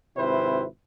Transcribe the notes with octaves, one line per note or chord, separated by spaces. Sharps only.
G#1 C3 E4 B4 C5